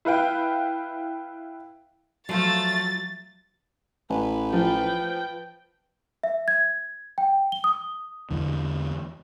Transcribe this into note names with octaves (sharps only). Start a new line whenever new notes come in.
E4 B4 F5 G5
F3 F#3 A3 A6
A1 B4
F3 G5
E5
G#6
G5
G7
D#6
E2 D3